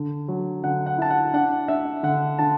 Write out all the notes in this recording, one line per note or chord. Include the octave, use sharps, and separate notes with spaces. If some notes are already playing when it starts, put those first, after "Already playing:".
Already playing: D3
F#3
D3 F#5
F#5
E4 A5
F#5
D4 F#5
D4 E5
D3 F#5
D3 A5